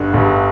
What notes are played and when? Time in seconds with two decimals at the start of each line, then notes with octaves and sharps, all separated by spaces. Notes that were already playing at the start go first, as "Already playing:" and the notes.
Already playing: G1 G2 D3
0.13 G1 G2 D3